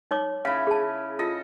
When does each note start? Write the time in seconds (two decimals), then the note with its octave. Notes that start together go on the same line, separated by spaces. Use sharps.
0.11 D#4 C#5 D6
0.45 C#3 E4 F5
0.67 G#4 A5
1.19 F4 A4 D#5